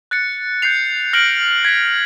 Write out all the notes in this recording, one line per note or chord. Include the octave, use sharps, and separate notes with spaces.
F#6 A6 C#7
G6 C7 F7
F6 A#6 D7 F#7
G#6 B6 D7